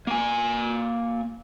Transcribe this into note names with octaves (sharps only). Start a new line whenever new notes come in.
A#3 G#5